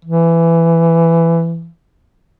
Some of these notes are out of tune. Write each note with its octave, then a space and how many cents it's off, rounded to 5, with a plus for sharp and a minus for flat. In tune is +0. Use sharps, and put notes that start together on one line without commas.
E3 +15